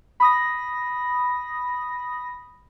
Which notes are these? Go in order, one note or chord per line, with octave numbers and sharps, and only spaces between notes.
B5 D#6 A#6